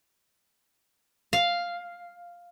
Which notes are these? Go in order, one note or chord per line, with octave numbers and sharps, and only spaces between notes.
F5